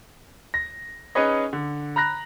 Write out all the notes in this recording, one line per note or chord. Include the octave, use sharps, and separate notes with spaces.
A#6
C#4 D#4 G#4 B4 C#5 D#5
D3
A#5 B5 F#6 A#6